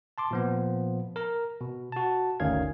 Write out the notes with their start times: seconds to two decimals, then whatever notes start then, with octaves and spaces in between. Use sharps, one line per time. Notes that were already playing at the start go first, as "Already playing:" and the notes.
0.18 A5 C6 D6
0.31 A#2 F3 B3
1.16 A#4 A#5
1.61 B2
1.92 F#4 A5
2.40 G1 D2 D#3 C#4 F5 G#6